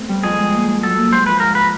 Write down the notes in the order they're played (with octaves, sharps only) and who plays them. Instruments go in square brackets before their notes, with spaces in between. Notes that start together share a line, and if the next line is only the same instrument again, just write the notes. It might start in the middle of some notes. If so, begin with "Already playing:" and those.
Already playing: [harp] A3 B3 C4
G3
[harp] F2 [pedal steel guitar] G#4
[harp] G#3
A#3
A#3
[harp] F#3 [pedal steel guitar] A4
[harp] A#3
[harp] G#3 [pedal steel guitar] C5
[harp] F3 [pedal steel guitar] B4
[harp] G#2 [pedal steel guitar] A#4
[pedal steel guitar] B4